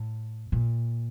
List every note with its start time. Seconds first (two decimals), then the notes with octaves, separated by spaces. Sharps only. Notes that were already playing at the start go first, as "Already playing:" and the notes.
Already playing: A2
0.52 A#2